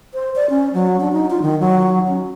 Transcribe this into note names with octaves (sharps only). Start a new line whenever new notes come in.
C5
D5
C#4
F#3
D4
D#4
F4
D#3
F#3
C#4